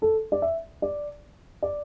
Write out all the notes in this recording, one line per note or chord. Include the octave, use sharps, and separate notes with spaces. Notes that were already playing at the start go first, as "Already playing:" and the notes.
A4
D5
E5
D5
D5